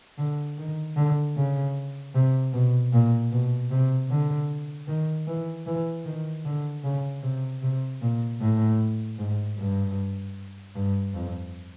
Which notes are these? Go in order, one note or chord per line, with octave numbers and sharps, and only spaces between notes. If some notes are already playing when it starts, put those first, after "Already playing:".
D3
D#3
D3
C#3
C3
B2
A#2
B2
C3
D3
D#3
E3
E3
D#3
D3
C#3
C3
C3
A#2
A2
G#2
G2
G2
F2